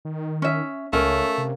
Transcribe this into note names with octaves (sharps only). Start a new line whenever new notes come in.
D#3
C#4 E5
C#2 A3 C#4 A#4 C#5 F5
C3